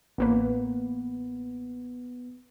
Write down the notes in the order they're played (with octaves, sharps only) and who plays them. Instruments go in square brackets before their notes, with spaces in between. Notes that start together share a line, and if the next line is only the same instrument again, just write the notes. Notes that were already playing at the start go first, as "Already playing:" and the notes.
[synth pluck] A1 A#3 B4 [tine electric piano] B3